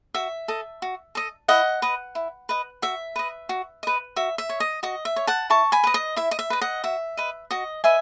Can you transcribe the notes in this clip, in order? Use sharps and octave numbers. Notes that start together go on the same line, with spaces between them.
F#4 E5
A4 D#5
F#4
A4 D#5
E4 D#5 F#5
B4 D#5
E4
B4 D#5
F#4 E5
B4 D#5
F#4
B4 D#5
F#4 E5
E5
C#5
D#5
F#4 D#5
E5
C#5
F#5 A5
E4 A5 C#6
G#5 B5
B4 D#5
D#5
E4 E5
D#5
E5
B4 D#5
D#5 F#5
F#4 E5
B4 D#5
F#4 D#5
B4 D#5 E5 G#5